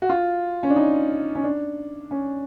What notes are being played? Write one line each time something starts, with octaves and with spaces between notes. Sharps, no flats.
F#4
F4
C#4
D4
D#4
C#4
D4
C#4